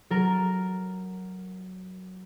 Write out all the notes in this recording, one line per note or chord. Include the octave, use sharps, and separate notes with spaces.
F#3 A4 A#4